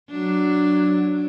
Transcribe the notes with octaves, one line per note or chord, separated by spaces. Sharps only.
F#3 D4